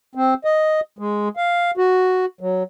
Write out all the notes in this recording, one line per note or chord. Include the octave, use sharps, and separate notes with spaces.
C4
D#5
G#3
F5
F#4
F#3